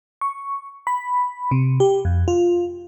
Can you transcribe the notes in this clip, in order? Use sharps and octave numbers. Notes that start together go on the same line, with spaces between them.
C#6
B5
C3
G4
F2
F4